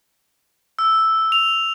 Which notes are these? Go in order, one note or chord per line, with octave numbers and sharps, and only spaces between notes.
E6
F7